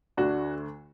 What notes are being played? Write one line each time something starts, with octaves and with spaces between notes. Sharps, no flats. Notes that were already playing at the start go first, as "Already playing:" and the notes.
D2 D3 A3 D4 F#4